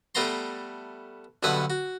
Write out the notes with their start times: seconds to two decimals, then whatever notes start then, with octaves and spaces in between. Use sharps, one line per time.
0.15 G3 A3 B3 A5 A#5 C6
1.43 B1 G2 D3 B3 E5 F#5
1.70 F#4